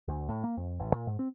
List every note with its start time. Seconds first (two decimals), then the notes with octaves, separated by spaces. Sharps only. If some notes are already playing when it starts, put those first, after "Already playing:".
0.08 D2
0.29 A2
0.44 A#3
0.57 F2
0.80 A1
0.94 A#2
1.07 G#2
1.19 C4